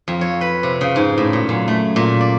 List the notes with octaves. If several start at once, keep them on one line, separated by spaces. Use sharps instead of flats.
F2
C#5
B4
C3
C#3
G#2
A2
A#2
F#2
A3
A#2
D5